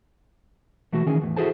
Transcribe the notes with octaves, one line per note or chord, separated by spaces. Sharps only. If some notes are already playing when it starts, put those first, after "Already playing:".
B2 E3 A3 F#4
D#3 E3 C#4 G#4
E2 A2
E4 F#4 G#4 A4 C5 A5